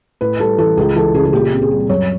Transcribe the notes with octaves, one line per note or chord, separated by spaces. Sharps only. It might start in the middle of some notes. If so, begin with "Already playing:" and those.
A2 B4
G3 A4
E3 A4
C#2 G#4
E3 A4
C#3 G#4
G#4
A#2 G4
C4
G#4
G3
F#2 C#5